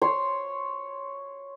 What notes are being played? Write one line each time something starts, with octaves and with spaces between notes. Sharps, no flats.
C#5 C6